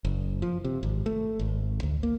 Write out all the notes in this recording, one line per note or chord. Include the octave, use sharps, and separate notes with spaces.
F#1
F3
C3
G#1
A3
G#1
D2
A#3